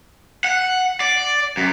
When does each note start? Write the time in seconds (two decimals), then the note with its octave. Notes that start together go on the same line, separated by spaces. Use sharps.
0.44 F#5
1.00 D5
1.57 F#2